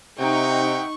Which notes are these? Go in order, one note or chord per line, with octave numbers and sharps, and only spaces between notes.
C3 D#4 E5 F#5 G5 C#6